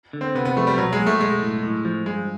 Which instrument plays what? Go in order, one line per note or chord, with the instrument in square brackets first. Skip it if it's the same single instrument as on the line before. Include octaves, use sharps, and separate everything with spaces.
[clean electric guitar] D3
[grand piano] C4
[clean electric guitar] C3 [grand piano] B3
[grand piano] B3
[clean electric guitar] F3 [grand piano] A3
[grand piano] G3
[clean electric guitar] B1 [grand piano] F#3
[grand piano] G#3
[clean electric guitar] A#2
[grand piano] A3
[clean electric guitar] B1 [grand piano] G#3
[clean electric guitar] A2
A2
F3
[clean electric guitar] G2 [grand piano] G#3